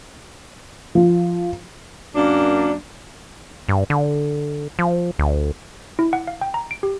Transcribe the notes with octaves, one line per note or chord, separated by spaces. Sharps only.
F3
F#2 A#3 D4
G2
D3
F3
D2
E4
F#5
F5
G5
A#5
D7
G4